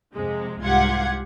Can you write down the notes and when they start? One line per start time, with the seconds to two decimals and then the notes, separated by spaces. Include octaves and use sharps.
0.14 F2 C3 G#3
0.63 C2 G#2 F4 G4 F#5 G#6